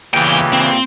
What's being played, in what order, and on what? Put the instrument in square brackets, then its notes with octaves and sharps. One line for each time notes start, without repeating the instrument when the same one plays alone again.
[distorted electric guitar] E2 G5 [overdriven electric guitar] A#2 G4 [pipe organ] C#3 E3
[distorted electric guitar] C4